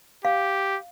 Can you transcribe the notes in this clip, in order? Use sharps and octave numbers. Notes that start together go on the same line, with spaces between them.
G4 F5